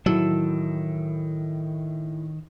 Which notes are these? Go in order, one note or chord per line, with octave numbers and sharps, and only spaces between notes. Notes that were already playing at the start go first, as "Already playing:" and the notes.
A2 D#3 E3 F#3 A5 E6